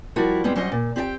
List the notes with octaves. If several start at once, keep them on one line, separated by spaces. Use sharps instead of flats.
F3 G3 E4 F#4 A#4
G3 G#3 B3 C4
F#3 G3 C#4 C5 D#5 F#5
A#2
C4 G4 D5 G5